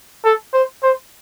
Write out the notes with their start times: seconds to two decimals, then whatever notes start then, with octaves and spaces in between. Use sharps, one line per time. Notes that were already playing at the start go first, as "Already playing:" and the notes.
0.25 A4
0.54 C5
0.83 C5